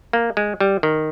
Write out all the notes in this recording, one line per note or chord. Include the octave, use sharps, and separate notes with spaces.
A#3
G#3
G3
D#3